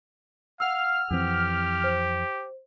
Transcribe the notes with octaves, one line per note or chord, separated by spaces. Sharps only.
F5 F#5 E6 F6
F2 E3 C4 G4
C5